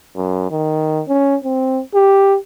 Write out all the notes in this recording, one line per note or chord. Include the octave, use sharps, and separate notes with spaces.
F#2
D#3
C#4
C4
G4